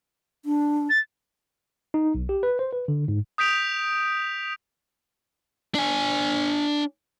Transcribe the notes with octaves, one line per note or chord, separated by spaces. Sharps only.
D4
A6
D#4
B1
G4
B4
C5
B4
D3
G#2
D#6 G6 B6 D7 F7
D4 G#5